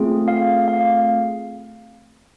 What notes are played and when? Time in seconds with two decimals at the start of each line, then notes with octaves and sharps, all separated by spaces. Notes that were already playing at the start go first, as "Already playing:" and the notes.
Already playing: A3 C4 F4 G#4
0.28 F5
0.68 F5